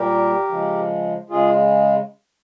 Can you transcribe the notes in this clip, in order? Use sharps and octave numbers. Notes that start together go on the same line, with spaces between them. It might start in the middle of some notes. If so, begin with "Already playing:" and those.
Already playing: A#2 G3 G4 A#4
C#3 F3 G#3
C#3 G#3 F4 G#4